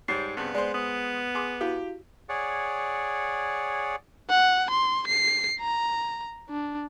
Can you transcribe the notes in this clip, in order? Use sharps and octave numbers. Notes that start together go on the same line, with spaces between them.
G#2 G3 C#5 A6 C7
G2 C#3 B3 C4
G#3 C5 D5
B3 D#6
G#4 C6 D6
E4 F#4 G4 F5
G#4 C#5 D5 F#5
F#5
C6
C7
A#5
D4